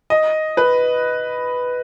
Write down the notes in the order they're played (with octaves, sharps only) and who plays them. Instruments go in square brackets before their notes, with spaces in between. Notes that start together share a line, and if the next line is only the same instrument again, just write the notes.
[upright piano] D#5
B4